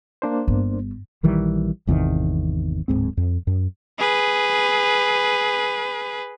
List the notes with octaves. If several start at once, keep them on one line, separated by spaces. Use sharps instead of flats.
A#3 D4 C5
G1
A#1 D#3 E3 G3
G#1 E2 C3 D#3
D1 G1 G#2 C4
F2
F#2
G#4 B4